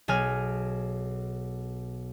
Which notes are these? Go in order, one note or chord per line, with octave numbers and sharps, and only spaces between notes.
B1 G#4 G#5 F6